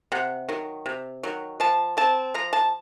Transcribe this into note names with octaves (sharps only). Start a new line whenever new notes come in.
C3 F#5
D#3 F#3
C3
D#3 F#3
F3 A5
C4 A5
F3 A#5
A5